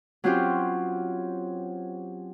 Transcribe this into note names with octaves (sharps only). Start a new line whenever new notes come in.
F#3 C4 C#4 F4 G4 C5